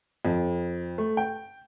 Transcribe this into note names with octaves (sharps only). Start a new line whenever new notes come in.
F2
A3
G5